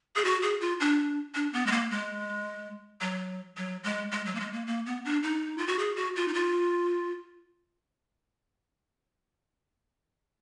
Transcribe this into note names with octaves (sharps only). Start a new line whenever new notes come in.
G#4
F#4
G#4
F4
D4
D4
B3
G#3
A#3
G#3
F#3
F#3
G#3
G#3
F#3
A#3
G#3
A#3
A#3
B3
D4
D#4
F4
F#4
G#4
F#4
F4
D#4
F4